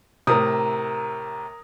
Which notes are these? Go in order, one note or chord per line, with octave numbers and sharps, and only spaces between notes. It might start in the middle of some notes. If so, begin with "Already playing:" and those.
A2 C3 A#4 A#5 D#6